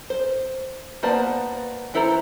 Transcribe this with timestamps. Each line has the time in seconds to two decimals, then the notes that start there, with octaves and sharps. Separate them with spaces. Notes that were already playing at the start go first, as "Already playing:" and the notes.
0.10 C5
1.03 A#3 B3 C5 D5 A5
1.94 E3 E4 A4 C5 A#5